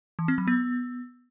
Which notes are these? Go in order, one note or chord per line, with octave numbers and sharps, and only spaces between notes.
E3
C4
F#3
B3